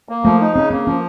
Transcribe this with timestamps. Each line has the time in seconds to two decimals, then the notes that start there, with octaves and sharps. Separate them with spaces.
0.09 A#3
0.24 F3 A3
0.41 D#4
0.56 C#3 C4
0.71 A#3 C4
0.87 F3 C#4